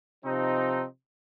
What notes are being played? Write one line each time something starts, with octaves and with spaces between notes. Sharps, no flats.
C3 F3 C4 D#4